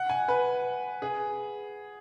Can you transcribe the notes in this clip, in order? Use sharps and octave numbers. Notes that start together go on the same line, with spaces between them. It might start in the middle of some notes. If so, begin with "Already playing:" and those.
Already playing: F#5
G#5
B4
G#4